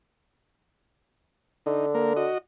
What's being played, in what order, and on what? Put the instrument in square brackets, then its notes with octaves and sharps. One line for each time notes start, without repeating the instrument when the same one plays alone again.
[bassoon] D3 [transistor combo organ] D#4
[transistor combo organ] A#3 A#4
F#4 D#5